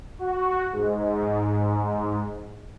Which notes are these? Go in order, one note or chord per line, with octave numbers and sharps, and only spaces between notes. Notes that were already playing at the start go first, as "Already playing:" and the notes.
F#4
G#2